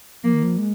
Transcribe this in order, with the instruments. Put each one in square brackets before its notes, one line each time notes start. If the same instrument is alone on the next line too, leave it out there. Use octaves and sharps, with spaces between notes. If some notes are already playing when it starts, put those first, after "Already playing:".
[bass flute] F3 [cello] A#3
[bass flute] D#3
F3
G#3